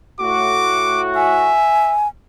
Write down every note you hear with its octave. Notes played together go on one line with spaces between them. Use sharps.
A2 F#4 D6
E5 G#5